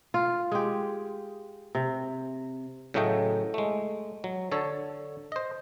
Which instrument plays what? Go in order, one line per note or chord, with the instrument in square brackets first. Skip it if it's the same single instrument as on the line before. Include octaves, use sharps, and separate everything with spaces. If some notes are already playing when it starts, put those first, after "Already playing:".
[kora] F4
G#3 G4
C3
[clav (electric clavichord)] A2 C#3 F#3 A3 D#5 G5
G#3 A3
F#3
D3 A4 C#5
C5 D#5